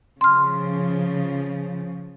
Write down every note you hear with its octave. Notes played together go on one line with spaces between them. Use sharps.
C#3 F3 C6 F6